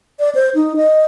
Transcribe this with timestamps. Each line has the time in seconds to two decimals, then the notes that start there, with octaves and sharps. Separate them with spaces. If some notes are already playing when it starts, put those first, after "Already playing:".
0.20 D5
0.35 C5
0.55 D#4
0.77 D#5